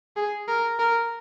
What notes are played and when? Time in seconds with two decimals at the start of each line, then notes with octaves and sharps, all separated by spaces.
0.16 G#4
0.48 A#4
0.79 A#4